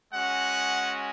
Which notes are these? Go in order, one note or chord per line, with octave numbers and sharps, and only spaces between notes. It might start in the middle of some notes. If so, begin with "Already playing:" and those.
G#3 C#4 F#4 F#5